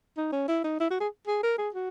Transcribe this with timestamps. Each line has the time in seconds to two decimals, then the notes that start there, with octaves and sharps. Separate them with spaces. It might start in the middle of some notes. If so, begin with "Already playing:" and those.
0.17 D#4
0.33 C#4
0.48 E4
0.64 D#4
0.80 E4
0.90 F#4
1.00 G#4
1.27 G#4
1.43 A#4
1.58 G#4
1.74 F#4